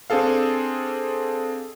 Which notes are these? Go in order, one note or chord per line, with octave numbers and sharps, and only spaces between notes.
C4 D4 G#4 A4 F5